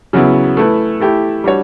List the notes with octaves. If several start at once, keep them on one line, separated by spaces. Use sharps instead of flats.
C#3 F#3 B3 E4
A3 E4 B4
A3 E4 G4
G3 D4 F#4 C#5